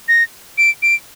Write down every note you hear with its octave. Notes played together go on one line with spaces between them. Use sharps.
A#6
D7
D7